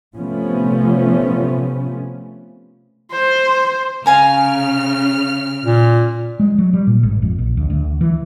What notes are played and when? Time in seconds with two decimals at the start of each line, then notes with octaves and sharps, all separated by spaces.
0.17 C3 F3 A3 B3 C#4
3.12 C5
4.06 C#3 F5 G#5 A#5 F6
5.64 A#2
6.40 G#3
6.58 F#3
6.73 G3
6.87 A#2
7.03 G#1
7.22 F2
7.39 A#1
7.57 D2
7.70 D2
8.01 E3